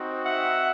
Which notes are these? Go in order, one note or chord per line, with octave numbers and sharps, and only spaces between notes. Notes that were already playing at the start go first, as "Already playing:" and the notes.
Already playing: C4 D#4 F#4
E5 F#5